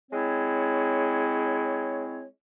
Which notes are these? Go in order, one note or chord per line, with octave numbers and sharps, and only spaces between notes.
G#3 C4 E4 C#5